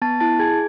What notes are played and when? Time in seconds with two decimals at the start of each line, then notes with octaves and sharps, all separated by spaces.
0.02 B3 A5 A6
0.20 E4 A5 A6
0.39 G#4 G#5 G#6